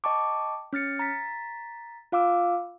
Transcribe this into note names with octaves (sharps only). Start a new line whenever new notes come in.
D#5 G5 A5 C#6 D6
C#4 F6 A6 C#7
A#5 A6 B6
F4 F5 D6 E6